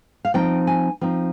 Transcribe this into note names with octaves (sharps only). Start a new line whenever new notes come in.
F5
F3 C4 D#4 G5
G#5
F3 C4 D#4